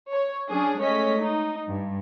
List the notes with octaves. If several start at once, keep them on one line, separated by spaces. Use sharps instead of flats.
C#5
F#3 C#4 D4 G#4
G#3 A3 C#4 C#5 D#5 B6
D#4
G2